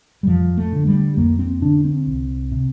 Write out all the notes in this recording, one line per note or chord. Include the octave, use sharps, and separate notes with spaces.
G3
F2 F3
A3
D3
G3
F2 A#3
C4
D3 D4
C4
C2
C3